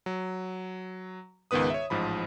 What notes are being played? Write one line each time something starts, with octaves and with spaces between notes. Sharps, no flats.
F#3
C#2 G#2 D#3 B3 B4 D#6
C#5 E5
A1 G#2 F3 B5